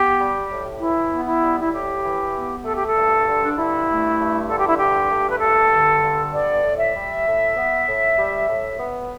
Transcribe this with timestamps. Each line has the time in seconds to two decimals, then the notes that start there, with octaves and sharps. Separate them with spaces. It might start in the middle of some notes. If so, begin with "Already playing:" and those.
Already playing: B3 G4
0.18 G3
0.50 A2
0.80 E3 E4
1.11 B3
1.26 E4
1.41 G3
1.60 E4
1.72 A2 G4
2.03 E3
2.34 B3
2.64 A3 A4
2.75 G4
2.87 A4
2.95 G2
3.26 D3
3.43 D4
3.56 G2 E4
3.87 A3
4.18 G2
4.49 D3 A4
4.58 G4
4.68 E4
4.78 G2 G4
5.09 A3
5.30 B4
5.40 G2 A4
5.71 D3
6.02 G2
6.33 B3 D5
6.63 A2
6.78 E5
6.94 G3
7.25 A2
7.55 B3
7.86 A2
8.16 G3
8.47 A2
8.78 B3